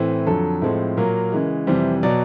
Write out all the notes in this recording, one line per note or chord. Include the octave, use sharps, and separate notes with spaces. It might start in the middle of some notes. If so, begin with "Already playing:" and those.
Already playing: A2 E3 A3 C4
F2 D3 F#3 A4
A2 F3 G#3 C4
A#2 F#3 A#3 A#4
C#3 E3 G#3
F2 C3 E3 G3 C5
B2 F#3 D5